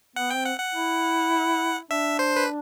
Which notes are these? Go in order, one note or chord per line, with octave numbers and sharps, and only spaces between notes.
B3 F#5
C4 G5
F#5
F#5
E4
D4 E5
C5
B4